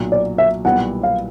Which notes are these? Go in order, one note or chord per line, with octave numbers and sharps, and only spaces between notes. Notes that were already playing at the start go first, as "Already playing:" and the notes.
Already playing: B1 A#2 F#3
D5
E5
B1 A#2 G3 B3 E4 F#5
F5